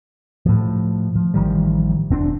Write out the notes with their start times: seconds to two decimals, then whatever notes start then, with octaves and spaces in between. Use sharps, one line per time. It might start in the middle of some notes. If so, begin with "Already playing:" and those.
0.46 A2 F3
1.16 F3
1.34 A1 D#3 F3 G3
2.11 E1 C4 D4